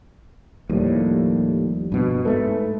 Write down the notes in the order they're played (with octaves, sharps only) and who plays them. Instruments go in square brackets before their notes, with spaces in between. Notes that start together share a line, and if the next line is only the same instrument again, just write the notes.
[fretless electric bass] D#2 A2 [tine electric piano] F3 G3
[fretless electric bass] G2 B2
[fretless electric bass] G#2 A3 [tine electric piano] A4 B4